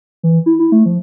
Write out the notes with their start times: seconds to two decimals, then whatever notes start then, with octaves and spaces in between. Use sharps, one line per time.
0.23 E3
0.46 E4
0.59 E4
0.72 A3
0.86 F3